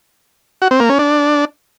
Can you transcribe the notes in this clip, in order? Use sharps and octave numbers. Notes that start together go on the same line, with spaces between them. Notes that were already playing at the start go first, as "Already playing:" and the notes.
F#4
C4
A#3
C#4
D4